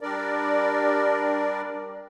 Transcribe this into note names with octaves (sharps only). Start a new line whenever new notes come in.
G3 D4 A#4 D5